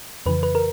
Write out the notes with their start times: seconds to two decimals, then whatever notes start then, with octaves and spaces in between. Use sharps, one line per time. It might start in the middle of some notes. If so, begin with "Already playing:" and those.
0.26 F2 C#3 E3 B4
0.43 B4
0.55 A#4